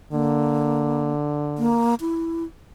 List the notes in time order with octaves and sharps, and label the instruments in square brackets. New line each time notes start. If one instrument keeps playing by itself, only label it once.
[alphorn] D3 [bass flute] A#3
[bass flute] A#3
E4